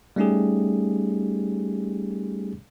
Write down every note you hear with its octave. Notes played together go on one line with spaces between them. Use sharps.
G3 A3 C#4 D#4 G4 G#4